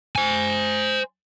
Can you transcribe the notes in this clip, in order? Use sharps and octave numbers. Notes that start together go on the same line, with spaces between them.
C5 G#5